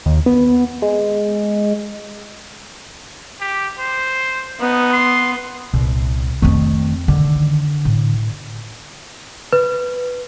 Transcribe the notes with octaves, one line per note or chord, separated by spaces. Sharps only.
D#2
B3
G#3
G4
C5
B3 D#4
C6
C2 A#2
F2 D#3 A3 C4
D3 D#3
A2
B4